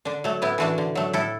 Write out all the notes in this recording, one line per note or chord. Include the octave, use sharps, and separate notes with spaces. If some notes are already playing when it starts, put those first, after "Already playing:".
D3 D4
F#3 A3
A2 B3 E4
E3 A3 D4 F#4
D3
F#3 A3
A2 E4 A4